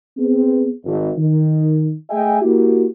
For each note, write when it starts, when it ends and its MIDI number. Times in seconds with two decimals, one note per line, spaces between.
0.18 0.69 59
0.18 0.69 60
0.18 0.69 68
0.85 1.10 32
1.18 1.92 51
2.10 2.42 57
2.10 2.42 68
2.10 2.42 75
2.10 2.42 76
2.10 2.42 79
2.10 2.42 80
2.42 2.86 58
2.42 2.86 64
2.42 2.86 66
2.42 2.86 67